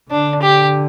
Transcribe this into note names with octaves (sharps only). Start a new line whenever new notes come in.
D3 D4
G4